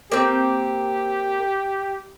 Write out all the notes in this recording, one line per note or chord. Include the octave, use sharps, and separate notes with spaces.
A#3 C4 G4